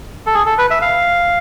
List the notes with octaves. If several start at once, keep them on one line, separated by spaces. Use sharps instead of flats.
A4
G#4
A4
B4
E5
F5